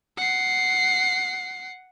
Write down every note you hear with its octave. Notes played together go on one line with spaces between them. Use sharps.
F#5 C7